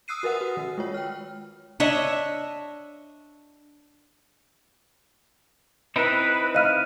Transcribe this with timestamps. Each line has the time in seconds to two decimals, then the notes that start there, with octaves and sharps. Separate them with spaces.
0.08 D#6 E6 F#6 C7 D#7
0.23 F#4 A#4 B4 F#5 D#6
0.41 F#4
0.57 D#3
0.78 G#3 F4 C#5
0.94 G5 F6
1.80 D4 C#5 D#5 E5
5.96 C4 D#4 E4 B4
6.55 D#5 F5 F6 F#6 D#7